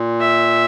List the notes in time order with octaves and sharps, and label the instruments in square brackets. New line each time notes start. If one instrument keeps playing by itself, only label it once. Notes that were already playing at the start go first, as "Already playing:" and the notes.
Already playing: [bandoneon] A#2
[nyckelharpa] E5